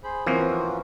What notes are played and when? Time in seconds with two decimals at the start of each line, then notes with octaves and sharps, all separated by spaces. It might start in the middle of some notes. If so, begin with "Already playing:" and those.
0.04 G#4 C5 B5
0.27 E3 F3 A#3 C4 C#4 F4 F#4 A#4